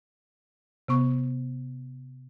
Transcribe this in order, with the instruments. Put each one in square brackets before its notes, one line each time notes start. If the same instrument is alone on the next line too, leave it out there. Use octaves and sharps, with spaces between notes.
[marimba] C3 B3 C#6